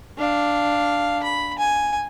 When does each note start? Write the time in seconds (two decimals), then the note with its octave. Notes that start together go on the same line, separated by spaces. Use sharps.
0.18 D4 F5
1.23 B5
1.58 G#5